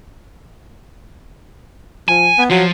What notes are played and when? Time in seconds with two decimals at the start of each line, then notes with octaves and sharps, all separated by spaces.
2.09 F3 G#5
2.38 B3
2.50 F3 F#3 F4